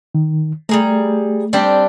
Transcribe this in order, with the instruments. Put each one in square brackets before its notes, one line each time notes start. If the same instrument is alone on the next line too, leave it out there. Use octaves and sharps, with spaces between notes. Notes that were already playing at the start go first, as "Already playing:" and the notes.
[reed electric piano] D#3
[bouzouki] G3 G#4 A#5 [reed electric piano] A3
[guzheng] G3 D4 G4 [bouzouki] C4